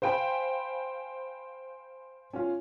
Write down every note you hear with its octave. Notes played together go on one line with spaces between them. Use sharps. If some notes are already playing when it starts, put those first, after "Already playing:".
C5 F5 G5 G#5 B5
C#4 F4